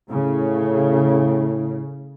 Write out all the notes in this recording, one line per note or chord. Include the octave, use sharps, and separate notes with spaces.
A2 C#3